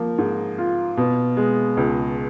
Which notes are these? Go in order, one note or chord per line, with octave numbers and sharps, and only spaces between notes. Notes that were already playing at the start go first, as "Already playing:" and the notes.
Already playing: F3 A#3
G#2
F4
B2
G#3
C#2